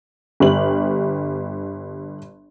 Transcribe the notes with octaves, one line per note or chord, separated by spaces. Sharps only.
G1 G4 F#7